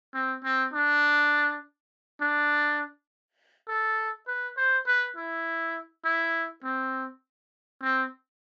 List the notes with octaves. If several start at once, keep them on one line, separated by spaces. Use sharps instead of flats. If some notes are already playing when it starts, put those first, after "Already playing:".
C4
C4
D4
D4
A4
B4
C5
B4
E4
E4
C4
C4